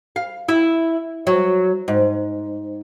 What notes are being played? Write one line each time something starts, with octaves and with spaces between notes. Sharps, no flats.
F5
E4
F#3
G#2